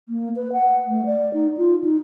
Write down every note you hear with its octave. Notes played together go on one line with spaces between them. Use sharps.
A#3
B4
F#5
A3
D5
D#4
F4
D#4